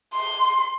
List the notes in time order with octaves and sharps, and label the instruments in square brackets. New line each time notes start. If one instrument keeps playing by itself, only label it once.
[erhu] C6